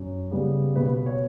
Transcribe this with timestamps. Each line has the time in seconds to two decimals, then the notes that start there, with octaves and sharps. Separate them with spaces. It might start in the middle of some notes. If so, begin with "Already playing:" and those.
Already playing: F#2
0.31 C#3 G3 B3
0.76 B2 B4
1.06 C#5